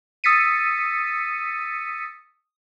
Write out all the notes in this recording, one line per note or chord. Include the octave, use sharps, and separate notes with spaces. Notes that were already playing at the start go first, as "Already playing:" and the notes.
D#6 E6 A6 B6 C#7 D#7